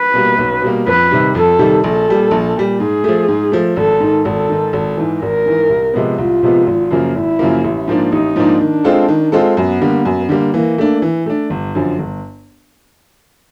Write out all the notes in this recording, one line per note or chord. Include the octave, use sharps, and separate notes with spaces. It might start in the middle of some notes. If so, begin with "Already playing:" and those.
Already playing: B4
B2 G3 A#3
B1
B2 G3 A#3
F2 B4
C3 D#3 G3
F2 A4
C3 D#3 G3
A#1 A4
A#2 G3
A#1
A#2 G3
G#2 G#4
F3 A3
G#2
F3 A3
G#1 A4
G#2 D#3
G#1 A4
G#2 D#3
G#1
G#2 E3
G#1 A#4
G#2 E3
C2
C3 F3 G#3 B3
C2 F4
C3 F3 G#3 B3
G#1
F#2 C#3 F3 A#3
G#1 E4
F#2 C#3 F3 A#3
A1
G#2 F3 A#3 D4
A1 D#4
G#2 F3 A#3 D4
D#3 D4
G#3 C4 F4 A4
D#3
G#3 C4 F4 A4
F#2 B3
D3 G3 A#3
F#2
D3 G3 A#3
E3 A#3
A3 D4
E3
A3 D4
G1
F#2 D3 F3
G1